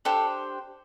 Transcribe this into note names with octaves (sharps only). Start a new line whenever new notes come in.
D4 G4 A4 C5